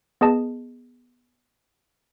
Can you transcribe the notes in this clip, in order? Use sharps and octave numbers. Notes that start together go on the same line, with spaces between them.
B3 G#4 D#5 A5